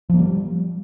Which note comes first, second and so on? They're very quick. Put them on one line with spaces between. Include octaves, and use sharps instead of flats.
F3 A#3 G3